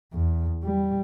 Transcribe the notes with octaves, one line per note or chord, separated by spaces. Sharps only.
E2
G3